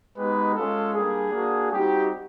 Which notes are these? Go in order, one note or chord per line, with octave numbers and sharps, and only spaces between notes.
G#3 B3 D#4 G4 B4
G#3 C#4 F4 A4
G3 A#3 D4 G#4
A#3 D4 F#4
G3 C4 D#4 F#4 G4